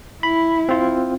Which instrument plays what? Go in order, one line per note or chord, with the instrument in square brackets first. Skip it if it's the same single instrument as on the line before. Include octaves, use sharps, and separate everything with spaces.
[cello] E4 [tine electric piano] B5
[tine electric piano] C4 F4